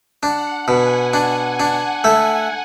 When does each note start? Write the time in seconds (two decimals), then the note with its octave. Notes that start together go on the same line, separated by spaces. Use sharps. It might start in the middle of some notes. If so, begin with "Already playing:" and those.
0.23 D4 F#5
0.68 B2 G#5
1.13 D4 F#5
1.60 D4
2.04 A3